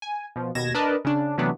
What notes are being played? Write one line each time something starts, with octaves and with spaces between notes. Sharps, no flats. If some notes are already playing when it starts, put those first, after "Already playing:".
G#5
B2 F3
D#2 B2 G#6 A#6 E7
D4 A#4 B4 D5 D#5 A5
C#3 D4
C3 E3 F#3 A3 B3 D4